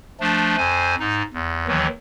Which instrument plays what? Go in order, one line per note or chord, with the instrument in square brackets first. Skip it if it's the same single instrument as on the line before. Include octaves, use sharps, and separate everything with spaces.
[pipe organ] F3 A3 D4
F2 C5 G#5
G#2 D#4
E2
D#2 D#3 E3 F#3